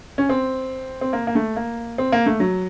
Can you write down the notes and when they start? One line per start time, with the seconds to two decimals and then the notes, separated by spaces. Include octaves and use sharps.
0.18 C#4
0.29 C4
1.01 C4
1.13 A#3
1.27 A#3
1.35 A3
1.56 A#3
1.98 C4
2.12 A#3
2.26 A3
2.40 F#3